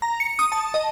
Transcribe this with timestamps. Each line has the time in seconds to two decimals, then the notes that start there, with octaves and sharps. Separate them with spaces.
0.02 A#5
0.20 C#7
0.39 D#6
0.52 A5
0.74 D#5